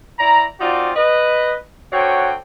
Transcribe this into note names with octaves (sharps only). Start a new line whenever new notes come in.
E4 D5 A#5
C4 D#4 F4 F#4 D5
B4 D#5
D3 C4 F#4 C#5 G5